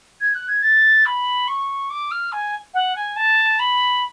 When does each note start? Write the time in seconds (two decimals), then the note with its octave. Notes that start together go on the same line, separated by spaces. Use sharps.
0.21 G#6
0.34 F#6
0.48 G#6
0.62 A6
1.06 B5
1.48 C#6
1.90 D6
2.11 F6
2.32 G#5
2.74 F#5
2.96 G#5
3.16 A5
3.59 B5